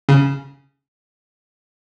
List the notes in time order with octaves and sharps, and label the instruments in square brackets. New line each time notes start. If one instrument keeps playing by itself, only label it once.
[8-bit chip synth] C#3